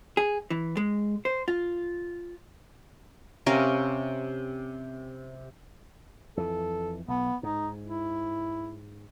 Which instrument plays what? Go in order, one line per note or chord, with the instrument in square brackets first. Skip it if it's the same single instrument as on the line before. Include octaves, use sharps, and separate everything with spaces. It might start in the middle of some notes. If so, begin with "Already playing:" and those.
[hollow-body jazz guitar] G#4
E3
G#3
C5
F4
[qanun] C3 C#4 A#4 F5
[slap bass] F2 E3 [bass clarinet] A4
[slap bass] B1 [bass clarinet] B3
[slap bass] G#2 [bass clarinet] D#4
[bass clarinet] E4